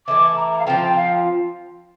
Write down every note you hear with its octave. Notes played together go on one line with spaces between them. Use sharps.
E3 A3 E4 D6
A#5
A#5
F5
F3 C4 F4 G5
G5
F5